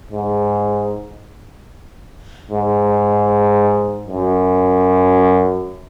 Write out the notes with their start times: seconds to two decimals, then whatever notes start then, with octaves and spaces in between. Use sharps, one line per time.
0.11 G#2
2.50 G#2
4.08 F#2